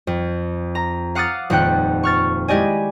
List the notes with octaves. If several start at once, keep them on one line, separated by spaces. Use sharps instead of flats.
F2
A#5
F5 F#5 D6 D#6 F6 A6
D#1 F2 F#5 G5 F#6
C#6 F6 A6
G#3 E4 G4 D5 D#5 G#5